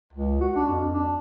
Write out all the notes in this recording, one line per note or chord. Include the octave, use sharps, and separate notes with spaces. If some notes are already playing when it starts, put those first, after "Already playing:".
C#2
F#4
D4
F2
D4